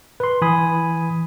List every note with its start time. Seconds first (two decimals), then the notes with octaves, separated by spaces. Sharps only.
0.20 B4 C6
0.42 E3 G#5 B5 D#6